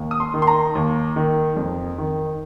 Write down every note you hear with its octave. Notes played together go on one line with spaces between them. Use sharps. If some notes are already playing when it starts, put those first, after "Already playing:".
Already playing: D#2
D#6
C6
D#3
C6
A#5
D#2
D#3
F2
D#3